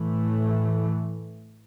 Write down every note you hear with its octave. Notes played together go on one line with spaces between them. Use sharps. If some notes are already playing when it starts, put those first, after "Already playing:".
Already playing: A2 E3 A3